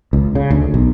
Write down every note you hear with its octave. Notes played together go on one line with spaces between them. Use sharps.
C#2
C#3
D2
B1